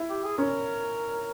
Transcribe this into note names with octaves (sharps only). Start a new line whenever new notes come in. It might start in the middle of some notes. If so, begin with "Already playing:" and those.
Already playing: E4
G4
G#4
C#4 A#4